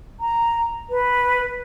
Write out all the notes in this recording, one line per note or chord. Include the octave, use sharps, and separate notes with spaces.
A#5
B4